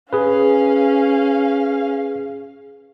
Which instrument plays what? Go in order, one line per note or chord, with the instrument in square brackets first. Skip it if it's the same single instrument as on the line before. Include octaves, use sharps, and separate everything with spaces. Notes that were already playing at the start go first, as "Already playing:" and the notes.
[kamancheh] C#4 F5 [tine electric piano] G#4 B4